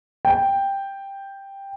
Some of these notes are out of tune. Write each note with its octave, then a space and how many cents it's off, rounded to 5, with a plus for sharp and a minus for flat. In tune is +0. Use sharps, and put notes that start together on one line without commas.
G5 +5